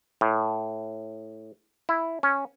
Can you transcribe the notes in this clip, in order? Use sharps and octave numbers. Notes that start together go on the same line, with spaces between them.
A2
E4
C#4